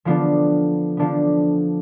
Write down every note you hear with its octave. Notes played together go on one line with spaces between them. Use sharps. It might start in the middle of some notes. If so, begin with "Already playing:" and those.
D3 F3 B3 D4 F4
D3 F3 B3 D4 F4